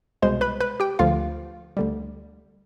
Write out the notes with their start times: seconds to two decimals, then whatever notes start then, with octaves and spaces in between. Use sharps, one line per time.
0.22 C2 B2 G#3 C5 C6
0.41 B4 B5
0.60 B4 B5
0.80 G4 G5
0.99 D2 D3 F3 F4 F5
1.77 D2 D3 G3